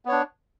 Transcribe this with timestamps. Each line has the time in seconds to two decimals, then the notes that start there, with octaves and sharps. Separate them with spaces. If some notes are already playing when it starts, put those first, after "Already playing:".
0.05 B3
0.09 C#5
0.12 D4